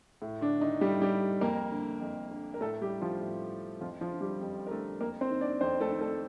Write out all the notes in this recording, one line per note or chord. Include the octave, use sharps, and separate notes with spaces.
A2
D3 D4
D#3 D#4
A2 G3 G4
G3 G4
F2 A#3 A#4
D3
F2
D3
A#4
A2 A3 A4
G3 G4
F3 F4
A2
F2 F3 F4
F3 F4
D3
G3 G4
F2
A#4
D3 A3 A4
F2 A#3 A#4
C4 C5
D#3
D4 D5
F2 C4 C5
A3 A4
D#3
A3 A4